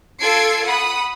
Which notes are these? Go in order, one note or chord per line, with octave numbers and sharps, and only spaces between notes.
F4 A4 E6 G#6 C7 D7
F#5 B5 D#6